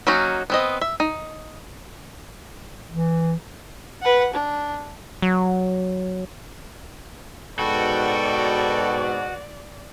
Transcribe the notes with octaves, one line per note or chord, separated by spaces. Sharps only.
F#3 A#3 C#4 D#4 F#4
B3 C4 D#5
E5
D#4
E3
B4 F#5
D4
F#3
G#2 B2 F#4 A4 B4 D5 G5